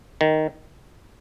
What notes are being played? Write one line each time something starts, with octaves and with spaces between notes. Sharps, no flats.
D#3